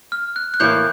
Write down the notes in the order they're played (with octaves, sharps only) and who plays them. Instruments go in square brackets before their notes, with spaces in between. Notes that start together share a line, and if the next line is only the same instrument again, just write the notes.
[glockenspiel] F6
F#6
F#6
[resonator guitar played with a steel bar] A2 E3 G3 A#3 [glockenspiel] G6